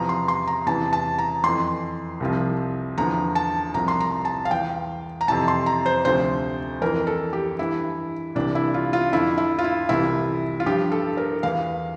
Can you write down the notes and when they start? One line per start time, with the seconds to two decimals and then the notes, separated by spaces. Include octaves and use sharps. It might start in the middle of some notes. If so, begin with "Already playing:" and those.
Already playing: E2 C3 F3 A#5
0.09 C6
0.28 C6
0.47 A#5
0.66 E2 C3 E3 A5
0.93 A5
1.18 A#5
1.43 F2 E3 C6
2.20 C2 C3 F3
2.98 E2 D3 F3 A#5
3.35 A5
3.74 C2 C3 F3 A#5
3.88 C6
4.00 A#5
4.25 A5
4.45 F5
4.51 E2 E3 G5
5.21 A#5
5.28 F2 C3 E3 A5
5.48 C6
5.66 A#5
5.86 C5
6.05 D2 C3 F3 C5
6.81 F2 E3 A#4
7.07 A4
7.33 G4
7.59 G2 E3 E4
8.35 C2 C3 E3 D4
8.55 E4
8.74 F4
8.93 F4
9.12 F2 D3 F3 E4
9.38 E4
9.58 F4
9.64 E4
9.89 C2 C3 E3 E4
10.60 F4
10.66 G2 F3 G4
10.92 A4
11.17 A#4
11.43 E2 E3 F5